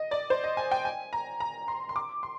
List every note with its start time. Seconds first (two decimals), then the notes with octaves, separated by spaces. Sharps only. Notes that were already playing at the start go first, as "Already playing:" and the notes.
Already playing: D#5
0.11 D5
0.30 C5
0.44 D#5
0.57 G#5
0.71 G5
0.85 G#5
1.13 A#5
1.40 A#5
1.68 C6
1.89 C6
1.96 D6
2.23 C6